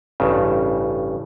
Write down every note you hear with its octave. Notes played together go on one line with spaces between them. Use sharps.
A1 G2 C#3